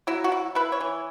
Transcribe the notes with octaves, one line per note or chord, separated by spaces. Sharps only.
F#3 E4
F#4
E4
E4 B4
C#5
E3